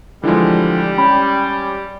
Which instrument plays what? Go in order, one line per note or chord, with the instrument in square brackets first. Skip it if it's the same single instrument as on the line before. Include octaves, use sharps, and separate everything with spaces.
[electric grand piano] D3 F3 [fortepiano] E3 G#3 [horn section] G3
[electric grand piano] C#4 [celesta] B5